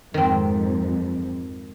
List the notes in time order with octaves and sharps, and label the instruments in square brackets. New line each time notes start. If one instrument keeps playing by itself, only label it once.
[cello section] F2 G#2 [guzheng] D#3 C4